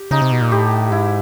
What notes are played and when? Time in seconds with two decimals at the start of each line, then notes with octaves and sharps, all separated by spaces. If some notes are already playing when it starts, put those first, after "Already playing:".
Already playing: G4
0.11 C#3 D#4
0.22 C3
0.32 B2
0.41 A#2
0.52 A2 G4
0.91 G#2 E4